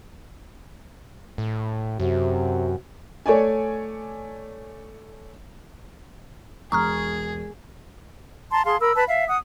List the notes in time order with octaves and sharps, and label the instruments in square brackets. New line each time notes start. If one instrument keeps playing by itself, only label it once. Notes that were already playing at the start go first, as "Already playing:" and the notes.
[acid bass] A2
[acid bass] F#2 [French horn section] C3 F#4
[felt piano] A3 C#5 D5 G#5
[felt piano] E1 [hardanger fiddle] G#4 [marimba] A#5 [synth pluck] C#6 D#6 F6
[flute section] A5 A#5 C6
G#4 F5 A5 C6
A#4 B5 E6
B4 A5 B5
E5 F5
F#5 D#6